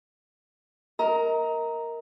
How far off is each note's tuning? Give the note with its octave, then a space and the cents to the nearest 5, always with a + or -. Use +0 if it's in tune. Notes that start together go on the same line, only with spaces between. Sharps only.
A#4 +0 D#5 +35 A#5 +0